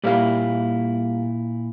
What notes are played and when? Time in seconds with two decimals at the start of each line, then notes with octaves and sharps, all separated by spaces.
0.04 A#2 G3 A#3 E4 F5